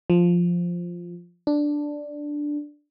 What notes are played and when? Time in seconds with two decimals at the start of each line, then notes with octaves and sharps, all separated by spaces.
0.10 F3
1.47 D4